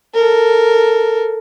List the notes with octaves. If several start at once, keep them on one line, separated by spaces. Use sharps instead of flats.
A4 A#4